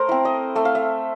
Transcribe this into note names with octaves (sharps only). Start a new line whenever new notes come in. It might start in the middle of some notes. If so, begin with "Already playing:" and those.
Already playing: A3 A#4 C5
C4 E4
D#5
A3 E5
F5
E5